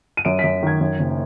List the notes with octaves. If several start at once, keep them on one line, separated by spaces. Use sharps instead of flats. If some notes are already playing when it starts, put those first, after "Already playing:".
D#7
F#2 D7
F#2 B6
D#3 G#6
F#2
F#1